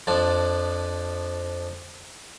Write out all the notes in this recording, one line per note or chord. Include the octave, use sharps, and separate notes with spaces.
F2 F3 D4